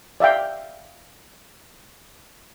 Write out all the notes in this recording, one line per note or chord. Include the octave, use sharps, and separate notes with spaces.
D5 E5 F5 G5